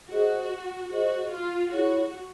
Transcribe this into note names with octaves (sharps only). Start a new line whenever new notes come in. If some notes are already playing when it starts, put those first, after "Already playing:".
F#4 G#4 C5 D#5
F#4 G#4 C5 D#5
F4
E4 F#4 G#4 C#5